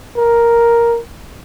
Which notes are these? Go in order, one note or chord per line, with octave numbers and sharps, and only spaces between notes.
A#4